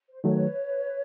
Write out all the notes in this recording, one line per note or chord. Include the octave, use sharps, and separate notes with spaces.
C5
D#3 F#3 A3 B4 C#5